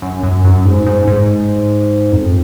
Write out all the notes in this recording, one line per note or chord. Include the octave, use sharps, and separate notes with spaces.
F#2
F#2
F#2
G#2
G#2
G#2
F2